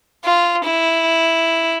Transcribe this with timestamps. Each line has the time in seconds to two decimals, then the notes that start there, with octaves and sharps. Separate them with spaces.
0.24 F4
0.64 E4